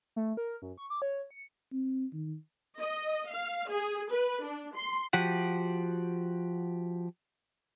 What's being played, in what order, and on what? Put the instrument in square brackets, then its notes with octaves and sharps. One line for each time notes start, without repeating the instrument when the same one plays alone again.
[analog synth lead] A3
A#4
F#2
C#6
D6
C#5
C#7
[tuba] C4
D#3
[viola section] D#5
F5
G#4
B4
D4
C6
[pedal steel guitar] F3 F#4 G4 F#5